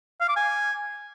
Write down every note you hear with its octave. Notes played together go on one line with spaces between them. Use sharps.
F5
D6
G#5